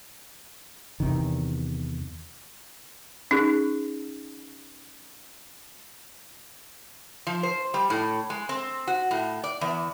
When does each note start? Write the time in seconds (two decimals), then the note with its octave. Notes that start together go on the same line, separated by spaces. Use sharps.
1.00 E2 C3 D#3
3.31 C#4 D#4 G#4
7.27 F3
7.43 C5
7.74 G3
7.90 A2
8.30 G#3
8.49 C4
8.87 F#4
9.11 A2
9.44 D5
9.61 E2